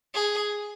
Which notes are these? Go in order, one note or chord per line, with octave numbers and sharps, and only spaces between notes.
G#4